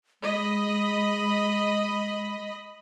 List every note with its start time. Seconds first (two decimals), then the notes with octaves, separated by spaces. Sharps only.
0.22 G#3 D#5 B5